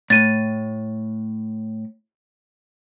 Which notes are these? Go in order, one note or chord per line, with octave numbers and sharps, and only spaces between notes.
A2 A6 D#7